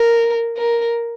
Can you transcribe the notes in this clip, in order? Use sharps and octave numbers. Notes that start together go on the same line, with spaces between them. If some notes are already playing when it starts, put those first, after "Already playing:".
Already playing: A#4
A#4